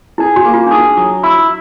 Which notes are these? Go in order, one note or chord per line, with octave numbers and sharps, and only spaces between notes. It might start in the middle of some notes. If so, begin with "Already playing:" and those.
E4 G#4
F#4
A#3
F4
D4
D#4 G#4
F#3
E4